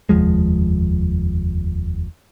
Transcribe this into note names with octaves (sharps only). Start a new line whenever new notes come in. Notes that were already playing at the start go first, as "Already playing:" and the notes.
F1 D#2 F3 G#3